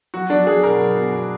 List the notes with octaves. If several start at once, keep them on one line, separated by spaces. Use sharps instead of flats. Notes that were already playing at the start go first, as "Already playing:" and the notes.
F#3 F#4
F#3 D4
F#3 G#4
B2 A#4
F#3
B2
B2